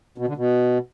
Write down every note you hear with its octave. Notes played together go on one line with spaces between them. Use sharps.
B2
D3
B2